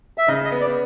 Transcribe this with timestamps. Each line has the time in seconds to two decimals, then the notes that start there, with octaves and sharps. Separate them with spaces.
0.18 E5
0.28 C#3 D#5
0.45 D#5
0.52 B3
0.61 D5